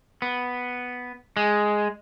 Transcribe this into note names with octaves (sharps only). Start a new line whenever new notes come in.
B3
G#3